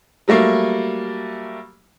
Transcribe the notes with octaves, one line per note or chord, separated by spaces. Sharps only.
F#3 G3 A3 A#3